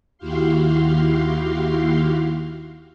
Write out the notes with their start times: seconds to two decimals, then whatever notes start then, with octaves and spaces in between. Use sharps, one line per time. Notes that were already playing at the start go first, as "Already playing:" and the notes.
0.18 D#2 E4 F#4 G4 F5 C6